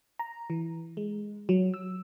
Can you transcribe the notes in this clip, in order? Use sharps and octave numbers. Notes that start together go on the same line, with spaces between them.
A#5
E3
G#3
F#3
E6